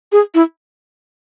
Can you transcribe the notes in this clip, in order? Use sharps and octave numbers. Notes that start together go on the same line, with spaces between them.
G#4
E4